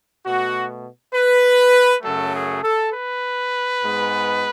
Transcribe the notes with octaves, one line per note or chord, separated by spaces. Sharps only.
B2 A3 F#4
B4
F#2 C#3 F#3 A3 A4
G#4
A4
B4
G#2 G#3 B3